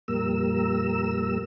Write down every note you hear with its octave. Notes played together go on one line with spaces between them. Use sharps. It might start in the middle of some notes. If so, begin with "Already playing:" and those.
F2 A#2 G3 A#3 A#4 E6